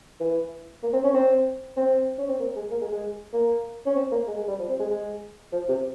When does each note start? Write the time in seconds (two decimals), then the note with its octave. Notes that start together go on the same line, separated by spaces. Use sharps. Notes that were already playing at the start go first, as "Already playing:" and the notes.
0.20 E3
0.83 A#3
0.93 C4
1.04 C#4
1.14 C4
1.77 C4
2.18 C#4
2.28 C4
2.39 A#3
2.55 G#3
2.71 A#3
2.81 G#3
2.92 G#3
3.33 A#3
3.86 C#4
3.96 C4
4.12 A#3
4.27 G#3
4.37 G#3
4.48 G3
4.59 F3
4.69 C4
4.79 G#3
4.90 G#3
5.53 F3
5.69 C3